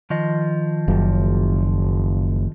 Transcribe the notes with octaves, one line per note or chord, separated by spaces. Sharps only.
D#3 F3 D#5
F#1